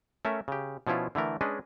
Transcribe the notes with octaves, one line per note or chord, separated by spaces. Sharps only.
A3 C#4 A#4 E5
C#3 G4
B2 F3 C#4 E4 F4
D3 E3 A3 A#4
G#3 C#4 D4 B4 D#5